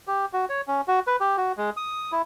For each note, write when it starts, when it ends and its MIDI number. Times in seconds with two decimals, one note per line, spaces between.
0.07 0.26 67
0.33 0.45 66
0.49 0.61 73
0.68 0.81 61
0.88 1.00 66
1.07 1.16 71
1.20 1.36 67
1.37 1.52 66
1.57 1.70 56
1.77 2.12 87
2.12 2.22 64